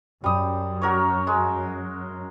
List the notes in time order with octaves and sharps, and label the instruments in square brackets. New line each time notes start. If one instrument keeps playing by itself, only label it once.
[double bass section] F#2 [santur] G3 D#6
[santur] F#4 A#4 C#5
G#3